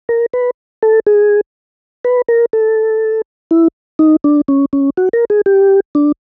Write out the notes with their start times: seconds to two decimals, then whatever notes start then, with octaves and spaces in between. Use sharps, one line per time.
0.09 A#4
0.33 B4
0.83 A4
1.07 G#4
2.05 B4
2.28 A#4
2.53 A4
3.51 E4
3.99 D#4
4.24 D4
4.48 C#4
4.73 C#4
4.97 F#4
5.13 A#4
5.30 G#4
5.46 G4
5.95 D4